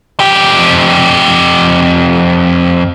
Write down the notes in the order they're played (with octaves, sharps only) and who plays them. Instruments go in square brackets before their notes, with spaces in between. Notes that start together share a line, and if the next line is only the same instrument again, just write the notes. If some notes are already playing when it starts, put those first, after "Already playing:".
[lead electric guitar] F2 G4